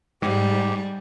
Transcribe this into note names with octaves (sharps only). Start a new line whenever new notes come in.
G#2 G3 G4